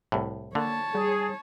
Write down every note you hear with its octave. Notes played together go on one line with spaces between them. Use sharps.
C2 A2
D3 A#3 C#5 A5
G3 G#4